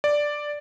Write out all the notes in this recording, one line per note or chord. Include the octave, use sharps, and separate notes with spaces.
D5